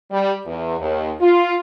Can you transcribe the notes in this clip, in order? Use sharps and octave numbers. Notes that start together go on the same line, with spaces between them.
G3
E2
D#2
F4